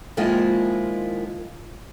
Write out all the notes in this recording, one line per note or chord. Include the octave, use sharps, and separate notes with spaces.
D#3 F3 G#3 A#3 E4 F4